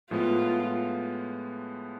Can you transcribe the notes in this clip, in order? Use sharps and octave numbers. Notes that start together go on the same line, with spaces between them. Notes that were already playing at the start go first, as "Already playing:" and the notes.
A2 F3 G#3 B3 F4